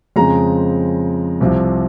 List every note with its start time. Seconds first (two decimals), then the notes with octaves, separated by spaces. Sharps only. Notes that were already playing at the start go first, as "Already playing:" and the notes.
0.16 F2 C#3 G#3 C4 A#5
1.41 C2 C3 F3